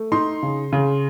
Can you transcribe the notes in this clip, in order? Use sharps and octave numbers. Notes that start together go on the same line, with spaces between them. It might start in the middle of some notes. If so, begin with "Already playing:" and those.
Already playing: A3
D#4 C6
C#3
C#3